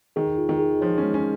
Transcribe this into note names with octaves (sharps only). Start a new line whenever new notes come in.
D#3 G#4
F4
D#3
G#4
F3 C#5
C#4
G#3
C#4